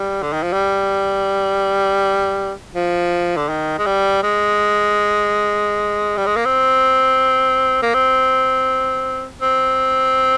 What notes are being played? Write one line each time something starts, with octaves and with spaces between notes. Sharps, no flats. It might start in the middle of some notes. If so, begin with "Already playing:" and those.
Already playing: G3
D3
D#3
F3
G3
F3
D3
D#3
G#3
G3
G#3
G3
G#3
A#3
C4
A#3
C4
C4